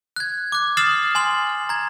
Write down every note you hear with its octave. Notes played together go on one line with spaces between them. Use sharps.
F#6 G#6
D6 F#6
D#6 F6 A6 C7 E7 F#7
G#5 C6 F#7
A#5 G#6